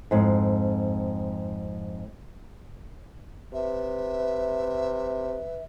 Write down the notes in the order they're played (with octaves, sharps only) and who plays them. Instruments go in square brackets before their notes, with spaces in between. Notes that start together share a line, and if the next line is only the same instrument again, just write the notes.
[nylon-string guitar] F2 G#2
[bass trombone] C3 [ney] B4 [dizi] E5